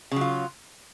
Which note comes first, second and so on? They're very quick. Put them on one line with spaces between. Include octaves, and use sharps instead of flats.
C#3 F#3 F4